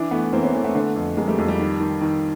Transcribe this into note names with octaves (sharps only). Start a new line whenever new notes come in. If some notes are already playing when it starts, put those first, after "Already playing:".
Already playing: E3 D4 E4
E3 A3 B3
E3 A#3 C4
B3 C#4
E3 A3 B3
A3 B3
D3
F2
F2 G#3 A#3
G3 A3
F2 G3
G3
D#3
D#3
D#3